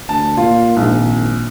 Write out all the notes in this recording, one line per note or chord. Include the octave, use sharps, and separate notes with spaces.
D2 A5
A#2 F4
A#1 G#2
G#1